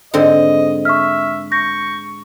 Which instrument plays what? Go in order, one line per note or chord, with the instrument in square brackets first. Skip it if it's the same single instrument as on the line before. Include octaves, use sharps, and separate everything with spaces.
[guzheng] G#2 D3 C4 [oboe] D#5
[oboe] E5 [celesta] C#6 F6
[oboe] C#6 [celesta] G6 A#6